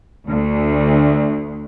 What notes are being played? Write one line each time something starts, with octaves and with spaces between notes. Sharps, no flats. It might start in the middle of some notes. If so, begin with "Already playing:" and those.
D2